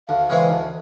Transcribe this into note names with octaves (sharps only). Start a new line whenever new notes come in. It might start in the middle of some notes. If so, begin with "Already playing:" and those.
D2 F5
C#3 E3 G#3 C4
D2